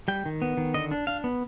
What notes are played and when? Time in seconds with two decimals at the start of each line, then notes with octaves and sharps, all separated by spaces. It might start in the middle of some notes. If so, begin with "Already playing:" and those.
0.08 G3 G5
0.26 D#3
0.42 B3
0.57 D#3
0.74 D3 D#5
0.91 D4
1.07 D4 F5
1.24 B3